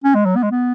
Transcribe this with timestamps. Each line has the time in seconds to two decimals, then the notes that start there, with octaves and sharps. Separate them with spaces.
0.04 C#4
0.15 G#3
0.26 F#3
0.36 B3
0.43 G#3
0.51 B3